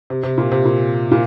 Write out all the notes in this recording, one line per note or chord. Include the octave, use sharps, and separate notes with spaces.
C3
C3
A#2
C3
A#2
A#2